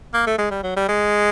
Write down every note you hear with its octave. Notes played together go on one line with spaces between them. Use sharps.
A#3
A3
G#3
G3
F#3
G3
G#3